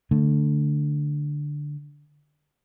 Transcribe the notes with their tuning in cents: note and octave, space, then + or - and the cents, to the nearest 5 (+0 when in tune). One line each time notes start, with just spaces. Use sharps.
D3 +0 A3 +5